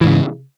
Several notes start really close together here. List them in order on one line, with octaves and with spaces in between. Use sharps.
E3 G#2 C#3